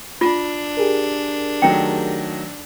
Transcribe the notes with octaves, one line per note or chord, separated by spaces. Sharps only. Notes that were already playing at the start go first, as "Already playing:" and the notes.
D4 F4
G4 G#4 A#4
D#3 F#3 A3 G5